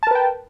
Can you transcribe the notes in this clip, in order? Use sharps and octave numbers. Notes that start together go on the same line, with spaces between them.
A#4 B4 G5 A5